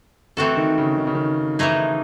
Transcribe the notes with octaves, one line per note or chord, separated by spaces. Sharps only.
E3 A3 C4 F#4 A4
D#3
C#3
D#3
C#3
D#3
E3 A3 D#4 G#4